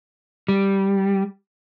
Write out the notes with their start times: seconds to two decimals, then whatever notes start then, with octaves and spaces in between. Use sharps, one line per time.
0.48 G3